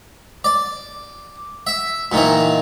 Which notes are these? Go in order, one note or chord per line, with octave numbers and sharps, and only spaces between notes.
D5
E5
A#2 D#3 E3